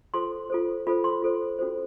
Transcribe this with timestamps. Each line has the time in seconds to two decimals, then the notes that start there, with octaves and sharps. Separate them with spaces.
0.14 F4 A4 C5 C6
0.50 F4 A4 C5
0.87 F4 A4 C5 B5
1.04 C6
1.22 F4 A4 C5
1.59 C#4 F#4 A4 C5